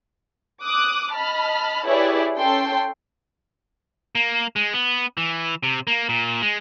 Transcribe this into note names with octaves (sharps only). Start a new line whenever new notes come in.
D6 D#6 F#6
D#5 A5 B5 F6
E4 G4 G#4 B4 C#5 D5
C#4 A4 G5 C6
A#3
G#3
B3
E3
C3
A#3
A#2
G#3